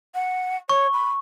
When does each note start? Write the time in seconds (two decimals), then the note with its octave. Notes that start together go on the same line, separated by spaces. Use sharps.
0.15 F#5
0.69 C#5 C#6
0.93 B5